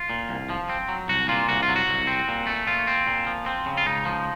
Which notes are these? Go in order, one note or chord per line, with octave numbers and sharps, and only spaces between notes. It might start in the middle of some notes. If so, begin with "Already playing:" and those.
Already playing: F4
A#2
C2
F3
C4
F#3
C2 F#4
A#2 F4
C2 F#4
F4
F#3
F#4
C2
C4
A#2
A3
A#2 F4
C4
A#2
F3
C4
C#3
F4
C#2 D#4
F3